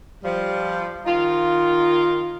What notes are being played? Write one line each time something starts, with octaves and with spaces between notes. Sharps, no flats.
F3 G3
D#3 D#4 F4